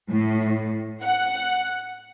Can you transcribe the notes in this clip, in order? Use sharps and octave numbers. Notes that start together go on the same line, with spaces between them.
A2
F#5